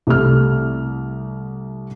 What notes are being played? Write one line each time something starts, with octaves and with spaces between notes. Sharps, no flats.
C2 G3 A3 F6